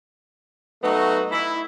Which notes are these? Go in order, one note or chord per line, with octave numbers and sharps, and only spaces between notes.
F#3 A3 B3 D#4 F#4
E4